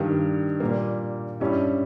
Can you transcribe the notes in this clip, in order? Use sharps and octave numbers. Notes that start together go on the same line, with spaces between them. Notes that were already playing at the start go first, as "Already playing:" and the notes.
Already playing: G2 D#3 G3
A#2 G3 A#3
G2 G3 C#4 E4